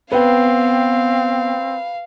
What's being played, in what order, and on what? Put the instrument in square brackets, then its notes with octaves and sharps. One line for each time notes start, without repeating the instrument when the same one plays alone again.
[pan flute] B3 [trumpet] C4 [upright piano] B4 G5 [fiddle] F5